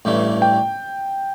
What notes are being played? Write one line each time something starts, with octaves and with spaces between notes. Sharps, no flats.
A1 G2 E3 A3
G5